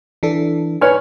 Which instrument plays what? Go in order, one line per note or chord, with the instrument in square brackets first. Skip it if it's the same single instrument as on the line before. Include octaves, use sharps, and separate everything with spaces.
[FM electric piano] E3 D4 A4
[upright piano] B4 C#5 [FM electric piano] G#5 C#6 F6